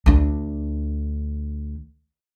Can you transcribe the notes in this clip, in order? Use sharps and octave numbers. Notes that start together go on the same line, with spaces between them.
D2 D4